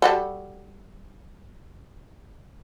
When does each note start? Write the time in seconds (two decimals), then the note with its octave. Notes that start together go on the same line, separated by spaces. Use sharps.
0.02 G3 F#4 A4